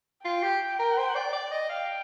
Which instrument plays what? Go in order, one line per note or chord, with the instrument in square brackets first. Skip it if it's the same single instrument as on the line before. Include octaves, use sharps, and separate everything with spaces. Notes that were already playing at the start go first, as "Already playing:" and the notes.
[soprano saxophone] F4 [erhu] G5
[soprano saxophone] G4
A#4
C5
D5
D5
D#5
[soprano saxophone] F5 [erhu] G5